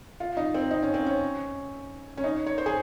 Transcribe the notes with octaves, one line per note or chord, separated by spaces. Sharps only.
F4
D#4
C4
D#4
C#4
C4
C#4
C#4
D#4
C#5
C5
G#4